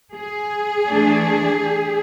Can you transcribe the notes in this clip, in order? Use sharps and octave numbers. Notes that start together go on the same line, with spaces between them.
G#4
E3 A3 D4